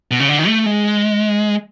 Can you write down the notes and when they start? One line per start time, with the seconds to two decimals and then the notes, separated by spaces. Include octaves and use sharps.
0.11 B2
0.20 C#3
0.29 D3
0.39 D#3
0.47 A3
0.66 G#3